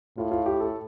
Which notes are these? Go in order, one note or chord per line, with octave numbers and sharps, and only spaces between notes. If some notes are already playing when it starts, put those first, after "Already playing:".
A2 F4
F4
G4
A4